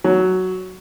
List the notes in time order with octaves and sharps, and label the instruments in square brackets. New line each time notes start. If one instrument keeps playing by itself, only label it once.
[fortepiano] F#3